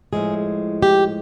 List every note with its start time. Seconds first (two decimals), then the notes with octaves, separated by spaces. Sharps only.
0.13 A2 F3 G#3 G#4
0.83 G4